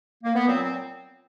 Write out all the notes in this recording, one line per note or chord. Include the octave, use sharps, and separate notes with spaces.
A#3
B3
A#2 F#3 C4
C4